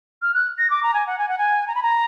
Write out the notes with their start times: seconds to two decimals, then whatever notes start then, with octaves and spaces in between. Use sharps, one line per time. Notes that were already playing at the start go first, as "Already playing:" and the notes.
0.22 F6
0.34 F#6
0.58 A#6
0.70 D6
0.83 A#5
0.94 G#5
1.07 F#5
1.19 G#5
1.29 F#5
1.38 G#5
1.68 A#5
1.75 B5
1.83 A#5